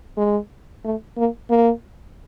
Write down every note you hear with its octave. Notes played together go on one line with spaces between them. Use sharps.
G#3
A3
A#3
A#3